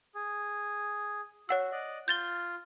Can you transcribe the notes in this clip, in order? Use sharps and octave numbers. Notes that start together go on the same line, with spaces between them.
G#4
F#4 C#5 F#5 E6
D5 D#5 F#6
F4 G6 A6 G7